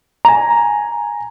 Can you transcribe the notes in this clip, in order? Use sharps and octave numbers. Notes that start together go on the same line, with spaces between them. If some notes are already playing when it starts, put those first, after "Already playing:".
G#5 A#5